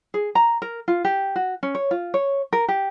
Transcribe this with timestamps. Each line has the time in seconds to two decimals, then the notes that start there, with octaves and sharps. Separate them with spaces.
0.14 G#4
0.35 A#5
0.62 A#4
0.88 F4
1.04 G4
1.36 F#4
1.63 C#4
1.75 C#5
1.91 F4
2.14 C#5
2.53 A#4
2.68 G4